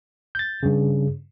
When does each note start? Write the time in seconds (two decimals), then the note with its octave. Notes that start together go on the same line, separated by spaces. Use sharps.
0.35 G6 A6
0.63 G2 C#3